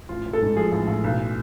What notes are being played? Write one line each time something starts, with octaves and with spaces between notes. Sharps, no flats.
A1 F4
A1
A4
G#2
F3 G#4
A1
A1
B1